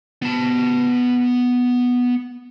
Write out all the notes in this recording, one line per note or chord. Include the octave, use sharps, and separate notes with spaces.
B3 A5